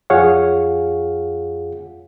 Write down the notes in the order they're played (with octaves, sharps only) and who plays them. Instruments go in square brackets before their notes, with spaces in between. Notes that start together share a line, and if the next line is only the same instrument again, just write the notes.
[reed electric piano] F2 F4 G#4 C#5 F5 F#5